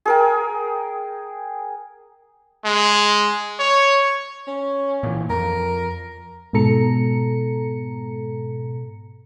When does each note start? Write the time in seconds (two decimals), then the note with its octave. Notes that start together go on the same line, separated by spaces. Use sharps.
0.05 G#4 A#4 G5
2.65 G#3
3.59 C#5
4.47 C#4
5.03 A#2 E3
5.30 F2 A#4
6.53 G#2 B2 A4 A#5 C#7